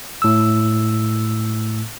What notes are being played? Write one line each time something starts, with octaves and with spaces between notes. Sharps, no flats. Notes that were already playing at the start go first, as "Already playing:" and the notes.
A2 E6